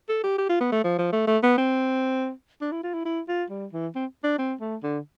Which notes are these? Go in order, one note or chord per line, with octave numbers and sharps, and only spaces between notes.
A4
G4
G4
F4
B3
A3
F3
F3
A3
A3
B3
C4
D4
E4
F4
E4
E4
F4
G3
E3
C4
D4
C4
A3
D3